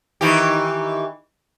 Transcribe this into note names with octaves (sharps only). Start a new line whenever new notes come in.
D#3 E3 G4